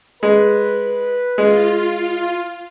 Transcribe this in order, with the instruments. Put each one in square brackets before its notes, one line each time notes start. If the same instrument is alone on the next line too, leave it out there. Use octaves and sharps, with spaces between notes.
[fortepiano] G#3 [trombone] B4
[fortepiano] G#3 [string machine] F4